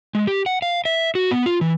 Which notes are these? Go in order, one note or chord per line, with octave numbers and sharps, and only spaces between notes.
G#3
G4
F#5
F5
E5
F#4
B3
F4
E3